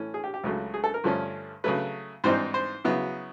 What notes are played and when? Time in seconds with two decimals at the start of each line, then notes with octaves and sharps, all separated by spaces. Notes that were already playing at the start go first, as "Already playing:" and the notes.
Already playing: A2 E3 A3 C#4 E4
0.14 G#4
0.24 G4
0.34 G4
0.43 C#2 C#3 F#3 A3
0.74 G#4
0.84 A4
0.94 A#4
1.04 G2 D3 F3 A3 C#4
1.64 C#3 F#3 A3 B4
2.24 G#2 E3 G3 C4 D#4 C5
2.54 C5
2.84 C#3 F#3 B3 E4